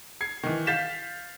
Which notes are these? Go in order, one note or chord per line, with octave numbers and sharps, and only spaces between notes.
G#6 C7
D#3 E3
F5 G6 A6 B6 E7